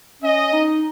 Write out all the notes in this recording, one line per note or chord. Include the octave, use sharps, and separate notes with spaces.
C#4 D#5
D#4